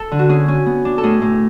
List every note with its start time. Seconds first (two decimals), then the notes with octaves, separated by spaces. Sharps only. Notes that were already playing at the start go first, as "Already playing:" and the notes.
Already playing: A4
0.12 D3
0.19 F#4
0.29 C#4 G#4
0.48 C#4
0.66 B3
0.85 D4
0.98 A4
1.03 A2 G#4
1.22 A2